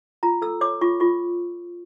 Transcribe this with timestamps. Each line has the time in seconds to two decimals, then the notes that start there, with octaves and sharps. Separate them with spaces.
0.23 F4 A#5
0.42 A4 E6
0.61 C#5 D6
0.81 F4 C#6
1.00 F4 C#6